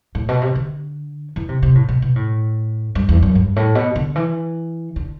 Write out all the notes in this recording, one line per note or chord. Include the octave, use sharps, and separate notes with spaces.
A2
B2
C3
D3
E3
C3
C3
A2
B2
B2
A2
G2
E2
F#2
G2
A2
B2
D3
E3
D3